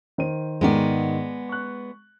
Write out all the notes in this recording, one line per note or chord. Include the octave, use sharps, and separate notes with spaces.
D#3 C5 D#7
G#2 D#3 G#3 B3 D5
C#6 F#6